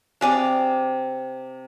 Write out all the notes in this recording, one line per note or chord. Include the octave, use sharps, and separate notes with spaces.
C3 D4 G#4 D5 F5